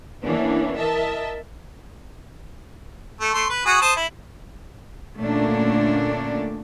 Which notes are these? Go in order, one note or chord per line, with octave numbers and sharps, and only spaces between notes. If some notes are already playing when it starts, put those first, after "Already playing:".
E3 A#3 B3 C#4 D4
A#4 D#5 E5 A5
A3
A3 C6
B4
F#4 G#4 D#6
C5 A5 D#6
E4
A#2 D3 A3 A#3 C#4 D4